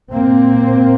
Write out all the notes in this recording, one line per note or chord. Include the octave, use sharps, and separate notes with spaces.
A#2 A#3 C4